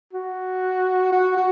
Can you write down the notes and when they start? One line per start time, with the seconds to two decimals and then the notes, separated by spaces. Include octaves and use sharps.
0.13 F#4
1.12 F#4
1.37 F#4